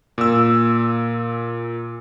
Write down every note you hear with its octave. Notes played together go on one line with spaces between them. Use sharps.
A#2 E6